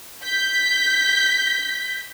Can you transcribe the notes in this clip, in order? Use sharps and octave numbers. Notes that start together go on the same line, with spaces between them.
G6 B6